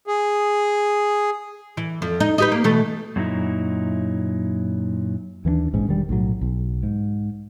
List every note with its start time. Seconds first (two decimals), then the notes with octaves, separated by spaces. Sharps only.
0.07 G#4
1.77 E3
2.02 F2
2.20 D#4
2.38 D#4 G4 B4
2.52 A#3
2.64 B2 E3 A3
3.16 F#2 A#2 F#3 B3 D#4 E4
5.45 D#2 E3 B3 D4
5.73 A#1 G#2 C#4
5.86 E1 D#3 G3
6.09 B1 A2 F#3
6.41 B1
6.83 G#2